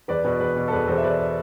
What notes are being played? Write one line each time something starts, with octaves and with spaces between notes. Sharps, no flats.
E2 B4 D5
B2 B4
E2 B4
B2
A4
E2 B4
E2 A4 C5
E5
E2 B4 D5